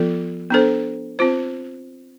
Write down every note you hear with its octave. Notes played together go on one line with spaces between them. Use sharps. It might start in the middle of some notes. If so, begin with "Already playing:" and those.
Already playing: F3 B3 F4 A4
B3 D4 A4 C5
C4 F4 C5